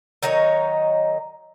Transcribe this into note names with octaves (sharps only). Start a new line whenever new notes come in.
D#3 F#3 D#4 C#5